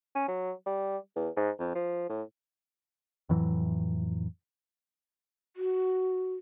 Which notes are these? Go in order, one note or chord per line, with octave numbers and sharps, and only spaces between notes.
C#4
F#3
G3
E2
G#2
F2
F3
A2
F2 A2 E3 F#3
F#4